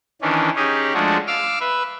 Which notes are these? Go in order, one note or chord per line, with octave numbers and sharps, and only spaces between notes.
D#3 E3 C#4 D4
C#4 D#4 G4 G#4
F3 G#3 A3 D4 F#4
F5 D6 E6 F6
B4 E5